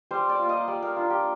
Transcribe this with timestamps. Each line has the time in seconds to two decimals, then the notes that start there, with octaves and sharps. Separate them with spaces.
0.11 G3 C5
0.29 D5
0.39 A#3 F4
0.49 D#5
0.68 G3 D5
0.82 A#4
0.96 D4 F4
1.10 G4